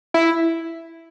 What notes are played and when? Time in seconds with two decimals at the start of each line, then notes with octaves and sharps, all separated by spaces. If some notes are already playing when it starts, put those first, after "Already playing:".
0.14 E4